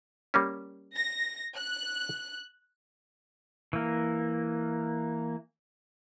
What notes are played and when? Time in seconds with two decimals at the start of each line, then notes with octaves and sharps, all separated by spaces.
0.34 G3 A#3 C#4
0.95 A#6
1.55 F#6
3.73 E3 A#3